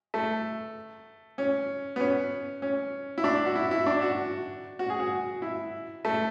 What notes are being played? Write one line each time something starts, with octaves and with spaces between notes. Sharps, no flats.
A3
C#4
B3
C#4
C#4
E4
D4
F#4
E4
E4
D4
F#4
F#4
G#4
F#4
E4
A3